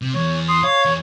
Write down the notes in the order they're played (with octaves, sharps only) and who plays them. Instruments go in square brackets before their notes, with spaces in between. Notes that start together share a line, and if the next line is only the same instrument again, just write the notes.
[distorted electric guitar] C3
[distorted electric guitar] E2 [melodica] C#5
[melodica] C6 D#6
[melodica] C#5 [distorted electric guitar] F5
[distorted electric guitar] E2